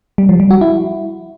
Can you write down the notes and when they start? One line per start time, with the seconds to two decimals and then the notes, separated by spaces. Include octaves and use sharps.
0.18 G3
0.29 F3
0.40 G3
0.51 F#4
0.61 E4